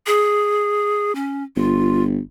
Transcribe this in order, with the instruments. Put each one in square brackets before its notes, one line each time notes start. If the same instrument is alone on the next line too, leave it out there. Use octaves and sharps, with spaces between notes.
[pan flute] G#4
C#4
[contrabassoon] G1 [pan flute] F4